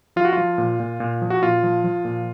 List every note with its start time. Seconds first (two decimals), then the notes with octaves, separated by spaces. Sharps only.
0.16 F3 F4
0.25 F#4
0.33 F3 F4
0.58 A#2
0.80 A#2
1.00 A#2
1.22 F3
1.30 F#4
1.42 A#2 F4
1.63 F3
1.84 F3
2.05 A#2